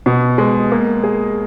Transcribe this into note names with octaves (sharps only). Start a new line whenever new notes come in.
B2
G#3
A#3
G#4